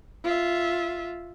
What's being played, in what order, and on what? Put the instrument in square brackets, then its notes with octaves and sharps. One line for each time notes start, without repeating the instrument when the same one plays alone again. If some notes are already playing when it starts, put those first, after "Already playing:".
[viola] F4 E5